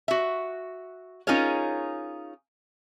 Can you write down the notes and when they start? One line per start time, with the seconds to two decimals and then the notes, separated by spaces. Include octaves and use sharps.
0.08 F#4 E5
1.27 C#4 D#4 F4 G#4 A#4 C#5